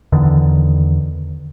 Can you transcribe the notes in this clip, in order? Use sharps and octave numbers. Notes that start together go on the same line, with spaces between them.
E2 D3 D#3